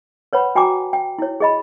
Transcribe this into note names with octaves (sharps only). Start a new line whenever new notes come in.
B4 C#5 F#5 B5
F#4 G5 G#5 A#5 D6
G5
E4 C#5
G#4 D#5 B5